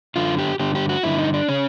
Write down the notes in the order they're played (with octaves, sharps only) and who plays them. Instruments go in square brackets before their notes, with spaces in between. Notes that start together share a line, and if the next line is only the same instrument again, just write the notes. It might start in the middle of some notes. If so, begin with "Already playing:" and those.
[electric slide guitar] F#2 D3 F4
G4
G2 D3 G4
G4
F#4
G2 D3 E4
D#4
D4
C#3 C#4